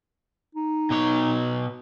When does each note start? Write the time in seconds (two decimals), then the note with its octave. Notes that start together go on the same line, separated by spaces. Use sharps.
0.55 D#4
0.90 B2 C#5